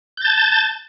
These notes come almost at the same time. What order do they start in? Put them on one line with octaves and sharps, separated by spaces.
G6 A6 A5